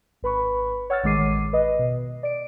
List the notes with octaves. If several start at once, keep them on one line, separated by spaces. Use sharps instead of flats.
G#1 B4 B5 C#6
C#5 F#5 E6 F6 A6
A1 D#3 G#3 D6 C7 D#7
B4 D#5
B2
D5 D7